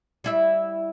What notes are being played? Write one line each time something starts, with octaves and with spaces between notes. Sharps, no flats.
G3 E4 E5